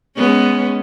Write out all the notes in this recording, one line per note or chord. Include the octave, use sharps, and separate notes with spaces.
G#3 B3 C#4